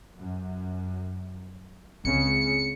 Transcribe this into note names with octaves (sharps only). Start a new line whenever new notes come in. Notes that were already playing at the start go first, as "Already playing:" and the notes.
F#2
C#2 C#3 C4 C#7